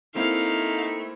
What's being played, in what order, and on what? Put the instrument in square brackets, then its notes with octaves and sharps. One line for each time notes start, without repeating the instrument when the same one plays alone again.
[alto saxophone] A3 [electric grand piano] A#3 C4 E4 [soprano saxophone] D#4 [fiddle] F5